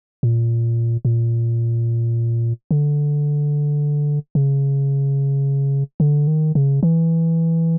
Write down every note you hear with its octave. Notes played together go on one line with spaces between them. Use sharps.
A#2
A#2
D3
C#3
D3
D#3
C#3
E3